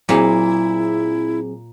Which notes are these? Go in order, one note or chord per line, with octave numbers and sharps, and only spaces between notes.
A#2 F#3 C4 E4 G#4